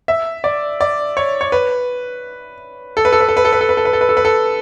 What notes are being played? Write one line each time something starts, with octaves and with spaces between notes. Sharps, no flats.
E5
D5
D5
C#5
C#5
B4
A4
B4
A4
B4
A4
B4
A4
B4
A4
B4
A4
B4
A4
B4
A4
B4
A4